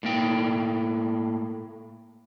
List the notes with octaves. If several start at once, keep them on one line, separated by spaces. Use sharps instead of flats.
A2 A#3 G5